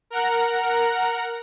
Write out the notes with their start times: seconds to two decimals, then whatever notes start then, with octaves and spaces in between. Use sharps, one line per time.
0.10 A#4 F#5 A#5